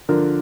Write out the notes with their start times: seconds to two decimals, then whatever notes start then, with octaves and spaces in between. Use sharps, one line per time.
0.09 D3 F3 D4 A#4